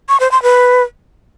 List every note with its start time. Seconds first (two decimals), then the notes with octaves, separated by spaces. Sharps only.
0.09 C#6
0.20 C5
0.31 C6
0.43 B4